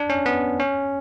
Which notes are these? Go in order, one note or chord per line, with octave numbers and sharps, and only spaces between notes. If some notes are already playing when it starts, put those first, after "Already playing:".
Already playing: D4
C#4
B3
C#4